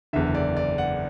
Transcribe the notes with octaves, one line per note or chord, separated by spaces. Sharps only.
F#1 E2 D3 E5
D5
D5
F#5